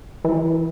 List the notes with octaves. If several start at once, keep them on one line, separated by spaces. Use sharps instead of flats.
E3